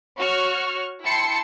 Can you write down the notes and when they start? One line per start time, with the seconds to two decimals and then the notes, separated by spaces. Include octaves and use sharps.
0.17 F#4 C#5 C#6 F6
1.04 E4 G5 A5 C6 C7 C#7